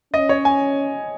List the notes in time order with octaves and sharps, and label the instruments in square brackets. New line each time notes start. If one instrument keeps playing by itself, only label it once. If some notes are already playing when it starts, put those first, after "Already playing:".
[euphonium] C#4 [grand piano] D#5
[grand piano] C#5
G#5